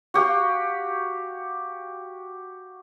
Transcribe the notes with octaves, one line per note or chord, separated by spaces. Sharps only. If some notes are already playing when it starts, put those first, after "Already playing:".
F#4 G4 F5